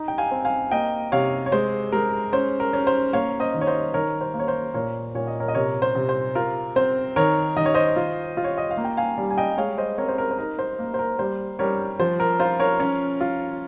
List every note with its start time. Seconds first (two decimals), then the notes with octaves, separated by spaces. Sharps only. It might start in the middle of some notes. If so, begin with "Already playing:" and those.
Already playing: D#4
0.08 G5
0.18 F5 G#5
0.31 C4
0.45 F5 G#5
0.71 A#3 D#5 G5
1.12 C3 C#5 F5
1.46 C#5
1.52 G#3 C5
1.92 G#3 A#4
2.33 C#4 C5
2.60 A#4
2.73 C#4
2.87 C5
3.13 A#3 C#5 F5
3.40 C5 D#5
3.54 D#3
3.61 C#5
3.67 C5 D#5
3.94 D#3 A#4 C#5
4.21 C5
4.34 A#3
4.39 C#5
4.48 C5
4.74 A#2 A#4 C#5
5.15 A#2 C#5
5.27 D#5
5.40 A#4 C#5
5.48 D#5
5.55 C3 A#4 C#5
5.82 C5
5.95 C3
6.09 C5
6.35 F4 A#4
6.76 C4 C5
7.16 D#3 A#4 C#5
7.57 D#3 D#5
7.66 C#5
7.75 C5 D#5
7.96 F4
8.37 F4
8.44 C#5
8.58 D#5
8.71 F5
8.77 A#3
8.85 G5
8.97 F5 G#5
9.18 G3
9.30 G#5
9.37 D#5 G5
9.58 G#3 C#5 F5
9.78 C5 D#5
9.98 C4 A#4 C#5
10.08 C5
10.18 A#4
10.31 C5
10.38 D#4 A#4
10.59 C5
10.79 A#3
10.94 C5
10.99 A#4
11.19 G3 C5
11.59 G3 A#4 C#5
11.99 F3 C5
12.20 A#4
12.40 F4 C5
12.60 A#4 C#5
12.80 C#4
13.21 F4